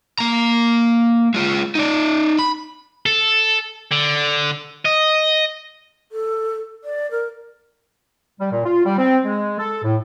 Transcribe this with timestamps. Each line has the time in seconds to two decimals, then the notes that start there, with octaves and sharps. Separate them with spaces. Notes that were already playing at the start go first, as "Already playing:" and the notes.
0.19 A#3 A#5
1.34 G#3 F4
1.75 D#4 D5
2.39 B5
3.06 A4
3.92 D3
4.85 D#5
6.12 A4
6.84 D5
7.11 A#4
8.40 G3
8.51 A#2
8.65 F4
8.85 G3
8.98 C4
9.25 G#3
9.59 A4
9.83 A2